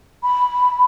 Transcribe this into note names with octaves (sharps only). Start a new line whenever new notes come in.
B5